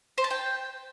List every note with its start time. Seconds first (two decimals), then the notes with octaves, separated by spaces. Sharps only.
0.18 C5
0.24 A5
0.31 G5